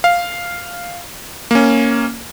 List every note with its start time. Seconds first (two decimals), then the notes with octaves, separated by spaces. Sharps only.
0.04 F5
1.51 A#3 C#4